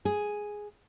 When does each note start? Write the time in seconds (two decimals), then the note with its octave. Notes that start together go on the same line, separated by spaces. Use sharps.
0.05 G#4